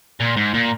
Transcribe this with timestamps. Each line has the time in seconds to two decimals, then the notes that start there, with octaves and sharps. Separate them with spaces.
0.20 A#2
0.37 G#2
0.54 A#2